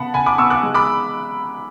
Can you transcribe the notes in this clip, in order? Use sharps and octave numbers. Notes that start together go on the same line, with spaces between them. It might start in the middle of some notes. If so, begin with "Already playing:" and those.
Already playing: C#3 B3 F#5 A5 B5
C#3 G#5 B5
B5 D6
B3 C#6 E6
D6 F#6
G#3
B5 D6